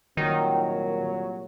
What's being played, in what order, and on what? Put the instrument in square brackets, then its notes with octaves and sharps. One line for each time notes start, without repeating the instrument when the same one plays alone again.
[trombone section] C2 A#2 F#3 [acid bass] D#3